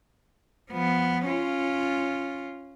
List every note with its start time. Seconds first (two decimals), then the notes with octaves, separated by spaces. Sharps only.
0.71 F3 B3
1.26 C#4 F4